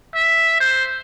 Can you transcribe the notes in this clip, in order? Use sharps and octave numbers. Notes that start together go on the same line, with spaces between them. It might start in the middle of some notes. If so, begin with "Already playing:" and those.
E5
C5